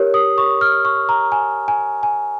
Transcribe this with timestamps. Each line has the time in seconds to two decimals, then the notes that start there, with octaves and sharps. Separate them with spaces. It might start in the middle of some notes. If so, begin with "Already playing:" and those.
Already playing: G4 A#4 C#5
0.14 D#6
0.38 C#6
0.61 F6
0.85 C#6
1.09 A#5
1.32 G#5
1.68 G#5
2.03 G#5